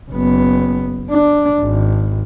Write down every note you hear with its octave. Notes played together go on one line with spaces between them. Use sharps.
F#1 B3
D4
G#1